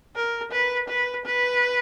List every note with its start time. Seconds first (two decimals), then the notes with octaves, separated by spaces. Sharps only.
0.16 A#4
0.52 B4
0.89 B4
1.26 B4